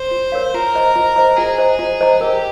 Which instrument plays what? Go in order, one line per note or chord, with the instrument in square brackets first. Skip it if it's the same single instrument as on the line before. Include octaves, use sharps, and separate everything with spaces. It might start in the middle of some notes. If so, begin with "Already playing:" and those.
Already playing: [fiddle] C5
[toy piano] F4
A#4 C#5 F5
[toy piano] F4 [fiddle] A#4
[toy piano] C5 D#5 A#5
F4
C5 D#5 A#5
[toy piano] F4 [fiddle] G#4
[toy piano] C5 D#5 A#5
F4
C5 D#5 A#5
[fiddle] G4 [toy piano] A#4